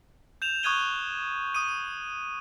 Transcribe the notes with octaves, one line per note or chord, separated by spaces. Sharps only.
G6 E7 F7
C#6 D#6 F#6 G#6 D#7 G7
D#6 D#7